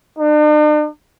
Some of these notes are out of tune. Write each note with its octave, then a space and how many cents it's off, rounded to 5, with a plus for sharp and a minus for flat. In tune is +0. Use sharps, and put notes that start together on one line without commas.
D4 +45